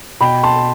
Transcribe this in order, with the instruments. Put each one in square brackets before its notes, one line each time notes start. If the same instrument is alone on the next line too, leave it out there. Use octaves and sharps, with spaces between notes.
[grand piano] B2 G5 B5
A5 C6